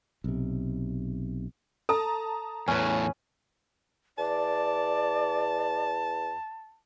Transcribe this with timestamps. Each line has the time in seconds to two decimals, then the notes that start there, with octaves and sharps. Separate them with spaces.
0.24 B1 C3
1.89 A4 A5 A#5 D#6
2.68 E2 A2 C#4 B4
4.18 E2 D5 A5